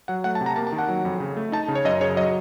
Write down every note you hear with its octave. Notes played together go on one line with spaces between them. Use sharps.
F#3 F#5
A3 F#5
A5
C3
A#5
A#3 A5
A5
D#3
F#5
F#3
F2
C#3
A3
D#4 A5
C#3
C#5
F#2 D#5
C#3 C#5
F#3 D#5